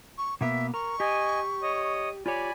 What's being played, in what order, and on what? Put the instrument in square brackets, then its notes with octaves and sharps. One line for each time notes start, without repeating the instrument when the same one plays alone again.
[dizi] C#6
[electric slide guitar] B2 A#3 B3 [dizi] E5
[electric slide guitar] A#4 [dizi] C#6
[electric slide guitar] G4 [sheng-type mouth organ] D#5 G#5
[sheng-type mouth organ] C#5 D#5 D#6
[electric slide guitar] F4 G4 C#5 [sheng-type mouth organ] D5 G#5 B5